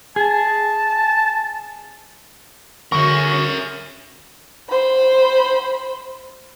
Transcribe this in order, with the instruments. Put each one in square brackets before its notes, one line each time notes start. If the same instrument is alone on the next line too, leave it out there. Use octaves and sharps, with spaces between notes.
[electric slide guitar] G#4 [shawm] A5
[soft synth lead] D3 [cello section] C#4 F#4 G#4 [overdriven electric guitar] A#4 E5 [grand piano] C#6
[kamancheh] C5 B5